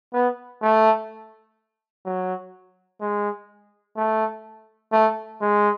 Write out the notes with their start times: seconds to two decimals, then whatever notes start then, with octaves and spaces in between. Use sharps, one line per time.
0.14 B3
0.62 A3
2.06 F#3
3.01 G#3
3.96 A3
4.92 A3
5.41 G#3